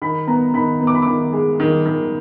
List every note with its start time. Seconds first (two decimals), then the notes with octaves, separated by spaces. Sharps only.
0.02 D#3 B5
0.27 B3 A#5
0.54 D#3 B5
0.81 B3
0.87 D6
0.95 B5
1.02 D#3 D6
1.33 G#3
1.60 D#3
1.86 D#3